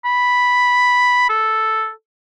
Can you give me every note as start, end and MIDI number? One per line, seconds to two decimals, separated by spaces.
0.05 1.25 83
1.30 1.90 69